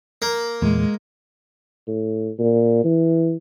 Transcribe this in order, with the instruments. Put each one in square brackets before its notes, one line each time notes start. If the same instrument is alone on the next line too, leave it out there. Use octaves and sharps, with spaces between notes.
[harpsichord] A#3
[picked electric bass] E2 A#2 [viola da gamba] G#3
[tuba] A2
A#2
E3